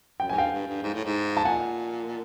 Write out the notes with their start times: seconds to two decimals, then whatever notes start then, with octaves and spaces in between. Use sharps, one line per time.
0.20 F#2 G5
0.29 G#2 G#5
0.35 G2 F5 G5
0.52 G2
0.67 G2
0.83 G#2
0.94 A2
1.04 G#2
1.37 A5
1.45 A#2 F#5 G#5